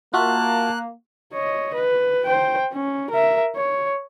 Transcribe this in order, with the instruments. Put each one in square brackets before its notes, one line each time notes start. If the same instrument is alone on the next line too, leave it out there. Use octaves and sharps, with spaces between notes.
[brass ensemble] A#3 [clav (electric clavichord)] F4 F#4 E5 [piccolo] A5 [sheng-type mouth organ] F#6
[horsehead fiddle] C#5 D#5
B4
C5 G5
C#4
A#4 E5
C#5